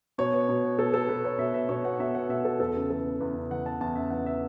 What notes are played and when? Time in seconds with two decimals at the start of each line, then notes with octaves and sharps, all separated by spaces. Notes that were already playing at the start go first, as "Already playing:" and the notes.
0.18 B2 C#5
0.33 B3
0.49 B2
0.64 B3
0.78 B2 A4
0.94 B3 A4
1.09 B2 B4
1.24 B3 C#5
1.39 B2 E5
1.54 B3 E5
1.69 B2 C#5
1.84 B3 F#5
2.00 B2 E5
2.15 B3 F#5
2.29 B2 E5
2.44 B3 A4
2.60 E2 A4
2.75 C#3
2.90 E3 A4
3.05 B3
3.20 E2 B4
3.36 C#3
3.51 E3 F#5
3.66 B3 A5
3.81 E2 A5
3.95 C#3 E5
4.10 E3 F#5
4.26 B3 E5